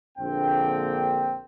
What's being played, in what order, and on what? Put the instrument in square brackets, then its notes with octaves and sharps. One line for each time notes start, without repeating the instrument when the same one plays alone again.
[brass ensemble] A#1 D3 A#3 C4 G5